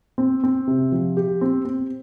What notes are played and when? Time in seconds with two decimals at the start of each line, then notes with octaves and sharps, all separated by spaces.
0.18 C4
0.44 C4
0.67 C3
0.92 F3
1.17 G4
1.41 C4
1.65 C4